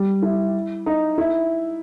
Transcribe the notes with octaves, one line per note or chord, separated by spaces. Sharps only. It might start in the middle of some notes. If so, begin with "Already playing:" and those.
Already playing: G3
E4
D#4
E4